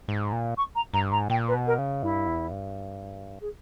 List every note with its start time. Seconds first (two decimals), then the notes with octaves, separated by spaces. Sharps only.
0.08 G#2
0.33 A#2
0.57 C#6
0.75 A#5
0.94 G2 A#5
1.12 G#2 A#5
1.30 A#2 G5
1.48 B4
1.54 B2
1.67 A#4
1.78 C#3
2.03 G2 E4
2.27 E2
2.52 G2
3.41 G#4